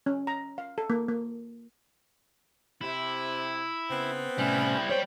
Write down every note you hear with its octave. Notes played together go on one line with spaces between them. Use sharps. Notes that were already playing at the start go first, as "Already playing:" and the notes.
C#4
A#5
F5
A4
A#3
A#3
C3 E4
C#3 B3 C4
A2 C3 G3 C#4 E4
G3 C5 C#5 G5